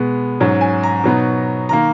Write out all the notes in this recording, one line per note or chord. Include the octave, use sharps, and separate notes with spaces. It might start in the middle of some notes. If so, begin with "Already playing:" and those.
Already playing: B2 G#3 B3 B5
G#2 F#3 C#4
G#5
A#5
B2 F#3 B3 D#4
D#3 A#3 A#5